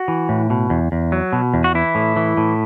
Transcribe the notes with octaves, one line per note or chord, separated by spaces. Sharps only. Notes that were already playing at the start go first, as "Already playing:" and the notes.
Already playing: F#4
E3
A2
B2
E2
E2
F#3
B2
E2
F#4
E3 E4
A2
E3
A2